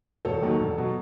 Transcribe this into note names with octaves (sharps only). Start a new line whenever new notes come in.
E1 A4 C#5
D#2 D#3 F#3
E1
B2 F#3